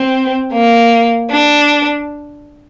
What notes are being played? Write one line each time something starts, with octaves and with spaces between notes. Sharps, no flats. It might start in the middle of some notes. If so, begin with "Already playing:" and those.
Already playing: C4
A#3
D4